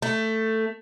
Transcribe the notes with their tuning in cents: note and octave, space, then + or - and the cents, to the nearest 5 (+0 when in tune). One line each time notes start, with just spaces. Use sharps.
A3 +10